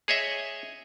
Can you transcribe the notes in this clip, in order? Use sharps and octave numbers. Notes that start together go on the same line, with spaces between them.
G#4 C#5 D#5 E5